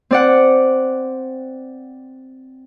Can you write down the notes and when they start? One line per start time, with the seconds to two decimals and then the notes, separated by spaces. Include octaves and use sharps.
0.11 C4 D5 F#5